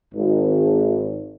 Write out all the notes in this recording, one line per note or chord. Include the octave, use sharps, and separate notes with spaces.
G#1